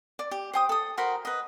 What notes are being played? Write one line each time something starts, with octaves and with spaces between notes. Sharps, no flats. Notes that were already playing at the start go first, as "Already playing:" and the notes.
D5
G4
C5 G5 D#6
A4 D#6
F#4 A#4 C5 B5
B4 D#5